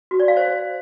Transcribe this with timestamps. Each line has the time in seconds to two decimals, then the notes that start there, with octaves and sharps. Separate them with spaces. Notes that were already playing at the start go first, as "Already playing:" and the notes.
0.11 F#4
0.20 D5
0.28 F5
0.37 C5